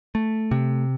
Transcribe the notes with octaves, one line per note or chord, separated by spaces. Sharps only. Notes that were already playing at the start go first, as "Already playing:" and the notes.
A3
C3